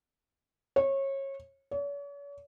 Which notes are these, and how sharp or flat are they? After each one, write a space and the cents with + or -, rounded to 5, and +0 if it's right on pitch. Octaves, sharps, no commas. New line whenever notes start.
C#5 -25
C#5 +45